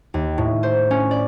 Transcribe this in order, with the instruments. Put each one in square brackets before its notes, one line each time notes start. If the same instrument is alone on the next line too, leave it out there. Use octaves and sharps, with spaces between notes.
[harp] D#2
A2
C5
C#4
D5